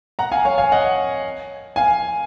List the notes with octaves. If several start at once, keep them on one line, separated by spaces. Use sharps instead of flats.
F#5 A#5
F5 G#5
C#5 F5
F5 G#5
D#5 F#5
F5 G#5